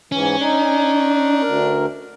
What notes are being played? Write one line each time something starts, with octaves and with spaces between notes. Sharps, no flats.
G#2 E3 C#4
D4 D#4
D2 A#4